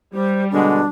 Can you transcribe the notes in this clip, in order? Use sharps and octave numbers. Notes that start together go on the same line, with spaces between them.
G3 C5
B2 D3 G#3 D4